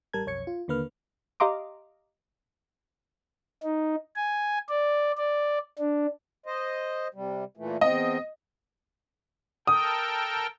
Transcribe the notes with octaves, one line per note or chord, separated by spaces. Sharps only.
A1 G3 A#4 A5 G#6
B1 F2 C#5 G#6 C#7
F4
D#2 D3 A#3 B4 F6
G4 D#5 F5 A#5 C6 D6
D#4
G#5
D5
D5
D4
C5 D#5
C3 G3
A#2 E3 A3
E2 C4 D#5
A4 A#4 G5 D#6